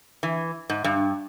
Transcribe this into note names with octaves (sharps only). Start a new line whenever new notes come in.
E3
G#2
G2